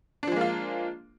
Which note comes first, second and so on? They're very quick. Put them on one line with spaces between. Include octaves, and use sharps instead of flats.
D4 F3 G#3 A#3 F4